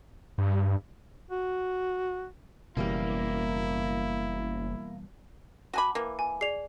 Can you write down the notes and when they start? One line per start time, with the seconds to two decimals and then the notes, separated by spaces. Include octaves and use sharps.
0.38 G2
1.31 F#4
2.77 F#1 B2 E3 G3 A#3 E4
5.73 F#4 F#5 G#5 A5 B5 D6
5.95 E3 A#3 D6
6.19 G#5
6.41 G#4 D5 C7 F7